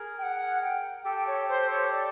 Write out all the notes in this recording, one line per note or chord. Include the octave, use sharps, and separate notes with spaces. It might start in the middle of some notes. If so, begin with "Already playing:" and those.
Already playing: G#4 A#4
G5
F#5
G5
G4 A4 G5
C#5
C5
C#5
D5